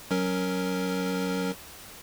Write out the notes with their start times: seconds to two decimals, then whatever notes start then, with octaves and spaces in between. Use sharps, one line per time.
0.11 F#3 C#4 A#4